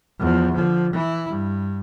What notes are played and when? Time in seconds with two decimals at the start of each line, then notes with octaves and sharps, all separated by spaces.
0.20 E2 F3
0.54 D3 F3
0.93 E3 E4
1.29 G2